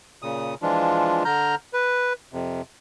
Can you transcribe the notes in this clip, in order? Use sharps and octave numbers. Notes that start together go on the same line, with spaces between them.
A#2 C#3 D#6
E3 F3 G#3 D4 F4
D3 A#5 F6 G6
B4
F2 C3